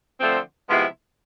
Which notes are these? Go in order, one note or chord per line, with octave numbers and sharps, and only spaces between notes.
D3 F3 A3 C4
C3 F3 G#3 B3 E4